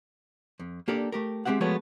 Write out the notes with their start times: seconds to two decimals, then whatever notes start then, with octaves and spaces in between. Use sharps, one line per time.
0.60 F2
0.88 A#3 D4 G4 A4 A#4 D5
1.12 A3 G4 A#4
1.45 G#3 C4 G4 E5 F#5
1.60 F3 G#3 A3 B3 F#4 C#5